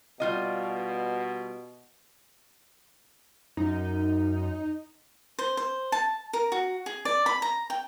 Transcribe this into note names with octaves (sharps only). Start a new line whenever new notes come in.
B2 G3 F4 D#5
F#2 D#4
C5
C5
A5
A#4
F#4
G#4
D5
B5
A#5
G5